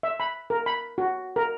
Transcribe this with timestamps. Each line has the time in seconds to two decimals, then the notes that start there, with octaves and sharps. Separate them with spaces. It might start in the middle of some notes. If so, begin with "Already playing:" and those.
0.03 E5
0.20 B5
0.50 A#4
0.66 B5
0.98 F#4
1.36 A#4